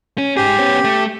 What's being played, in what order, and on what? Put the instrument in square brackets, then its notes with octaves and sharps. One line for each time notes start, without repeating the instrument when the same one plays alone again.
[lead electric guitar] C#4
[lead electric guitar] G#2 G#4 [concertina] G4
[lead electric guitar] B3 C#4
A3